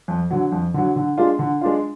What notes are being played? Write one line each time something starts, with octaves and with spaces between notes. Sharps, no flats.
F2
D3 F#3
F2
D3 F#3
D3
G#3 D4 F4
D3
G#3 D4 F4